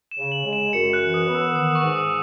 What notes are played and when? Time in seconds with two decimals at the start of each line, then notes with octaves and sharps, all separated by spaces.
0.11 E7
0.18 C#3
0.32 F#7
0.45 G#3
0.53 E7
0.73 F#2 C#7
0.93 F#6
1.00 E3
1.14 D#6
1.27 B3
1.35 E6
1.55 D#3 D#6
1.71 D#6
1.75 C#6
1.83 G#2
1.96 D#6